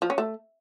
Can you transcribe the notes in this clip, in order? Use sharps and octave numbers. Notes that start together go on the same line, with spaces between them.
F3
C#4
A3